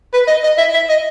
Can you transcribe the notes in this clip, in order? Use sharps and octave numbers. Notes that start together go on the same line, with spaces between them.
B4
D#5
D#5
E5
E5
D#5